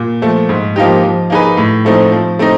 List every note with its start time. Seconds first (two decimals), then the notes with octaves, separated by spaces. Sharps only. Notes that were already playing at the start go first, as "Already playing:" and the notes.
Already playing: A#2
0.22 F3 A3
0.49 G#2
0.76 F3 A#3 D#4 G4
1.03 F3
1.30 A#3 D#4 G#4 B4
1.57 A2
1.85 F3 A3 C4 D#4
2.12 F3
2.39 A3 C4 D#4